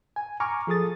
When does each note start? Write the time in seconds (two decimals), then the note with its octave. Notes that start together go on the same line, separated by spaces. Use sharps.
0.16 G#5
0.40 G#5 A#5 C#6 D6 F6
0.67 F3 G#4 A4 D#6 A6